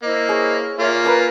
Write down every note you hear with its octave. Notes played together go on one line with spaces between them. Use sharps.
A#3 E4 C5 D#5
G#4 C#5
A#3 F4 C#5 E5 G#5
F6
A#4 B4 G#5 A#5 D6